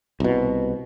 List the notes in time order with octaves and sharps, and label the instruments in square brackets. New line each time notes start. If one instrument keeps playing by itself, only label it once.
[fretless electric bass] C2 B2